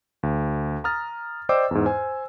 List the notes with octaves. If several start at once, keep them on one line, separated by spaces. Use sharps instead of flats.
D2
A#5 D#6 F6 A6
C5 D5 D#5 G5 D6 E6
E2 G#2
C5 G#5